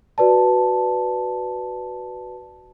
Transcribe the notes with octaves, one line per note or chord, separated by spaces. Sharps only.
F#4 B4 D5 A5